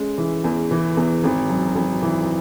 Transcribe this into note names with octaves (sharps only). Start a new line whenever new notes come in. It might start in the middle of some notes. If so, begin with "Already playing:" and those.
Already playing: G#3 C#4
E3
E2
E3
E2
G#1
F#2
G#1
E3